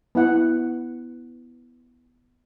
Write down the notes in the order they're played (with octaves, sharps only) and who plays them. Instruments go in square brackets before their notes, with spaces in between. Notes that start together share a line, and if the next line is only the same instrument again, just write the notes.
[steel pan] B3 E4 F#5